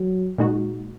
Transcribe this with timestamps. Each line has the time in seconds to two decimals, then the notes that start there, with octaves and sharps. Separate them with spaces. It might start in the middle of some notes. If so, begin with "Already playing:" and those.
Already playing: F#3
0.38 A#2 G#3 D#4 F#4